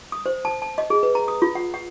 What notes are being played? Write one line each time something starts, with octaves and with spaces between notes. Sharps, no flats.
D#6
C5
A5
A5
D#5
G#4
B4
A#5
D#6
F4
F#5
F#5